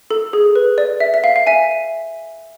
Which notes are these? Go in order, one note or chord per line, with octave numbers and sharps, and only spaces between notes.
A4
G#4
B4
D5
E5
E5
F5
F5
E5 G#5